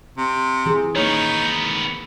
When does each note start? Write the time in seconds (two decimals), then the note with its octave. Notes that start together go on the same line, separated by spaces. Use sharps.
0.18 C3
0.66 E3 G#4
0.96 D#3 A#3 B3 D#4 C#5